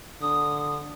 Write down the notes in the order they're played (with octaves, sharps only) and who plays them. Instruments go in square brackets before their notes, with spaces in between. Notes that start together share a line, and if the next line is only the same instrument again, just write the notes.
[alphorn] D3 [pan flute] D#6